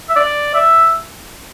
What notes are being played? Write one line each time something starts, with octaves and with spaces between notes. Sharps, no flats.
E5
D5
E5